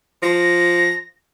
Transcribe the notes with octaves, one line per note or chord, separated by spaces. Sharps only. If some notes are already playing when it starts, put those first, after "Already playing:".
F3 A#6